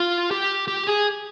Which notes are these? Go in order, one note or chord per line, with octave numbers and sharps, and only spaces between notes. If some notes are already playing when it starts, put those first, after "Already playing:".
Already playing: F4
G4
G4
G#4